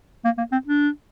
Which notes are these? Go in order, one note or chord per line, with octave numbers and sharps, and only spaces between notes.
A#3
A#3
C4
D4